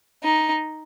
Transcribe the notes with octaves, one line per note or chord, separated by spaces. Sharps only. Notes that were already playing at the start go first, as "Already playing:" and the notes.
D#4